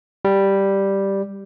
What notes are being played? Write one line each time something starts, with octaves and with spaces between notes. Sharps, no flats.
G3